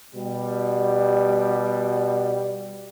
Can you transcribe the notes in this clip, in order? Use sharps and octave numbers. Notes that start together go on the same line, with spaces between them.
B2 G3